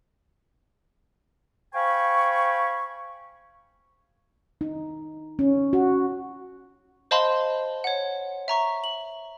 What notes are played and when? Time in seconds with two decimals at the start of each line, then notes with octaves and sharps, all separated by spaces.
1.75 C5 F5 G5 G#5 B5 C#6
4.61 D#4
5.39 C#4
5.73 F#4
7.11 C5 D#5 F5 A5 B5 C6
7.84 C#5 F#5
8.48 E5 A#5 C#6
8.84 F#7